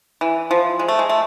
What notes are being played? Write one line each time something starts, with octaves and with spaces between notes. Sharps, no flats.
E3
F3
G#3
A3
G#3
A3